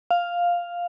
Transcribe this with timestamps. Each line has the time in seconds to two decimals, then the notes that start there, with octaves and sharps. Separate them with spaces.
0.11 F5